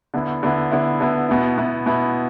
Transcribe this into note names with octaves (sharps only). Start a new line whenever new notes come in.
D3 B3 E4
D3 B3 E4
D3 B3 E4
D3 B3 E4
B2 B3 E4
B2 B3 E4
B2 B3 E4